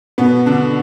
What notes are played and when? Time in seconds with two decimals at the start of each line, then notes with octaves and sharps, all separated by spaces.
0.18 B2 B3
0.46 D3 D4